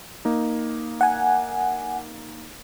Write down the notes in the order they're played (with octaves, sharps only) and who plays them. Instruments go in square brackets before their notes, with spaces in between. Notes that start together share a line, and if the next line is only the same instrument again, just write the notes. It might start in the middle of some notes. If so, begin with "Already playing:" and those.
[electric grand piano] A#3 D#4
[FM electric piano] F#5 G#5